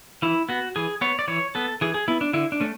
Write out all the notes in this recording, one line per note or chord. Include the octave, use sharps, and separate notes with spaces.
E3 E4
B3 F#4
E3 G#4
B3 C#5
D5
E3 C#5
B3 A4
E3 G#4
G#4
B3 E4
D4
D3 E4
D4
A3 C#4